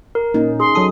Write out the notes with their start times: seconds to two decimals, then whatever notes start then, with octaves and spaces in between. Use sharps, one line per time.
0.15 A#4
0.34 A#2 C#4 D#4
0.60 G#4 C6
0.75 F#3 D#4 A4 D#6